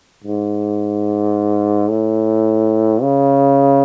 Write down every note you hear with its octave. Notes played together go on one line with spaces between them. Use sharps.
G#2
A2
C#3